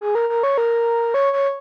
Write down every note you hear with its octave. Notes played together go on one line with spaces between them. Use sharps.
G#4
A#4
A#4
C#5
A#4
C#5
C#5